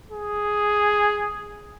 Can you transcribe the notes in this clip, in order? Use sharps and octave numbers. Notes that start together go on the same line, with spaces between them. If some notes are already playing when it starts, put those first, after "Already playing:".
G#4